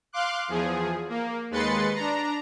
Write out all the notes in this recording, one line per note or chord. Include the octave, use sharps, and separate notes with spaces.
F5 C6 D6 F#6
E2 F3 G#4
A#3
D#2 G#3 B4 C6 A6 C#7
D4 A#5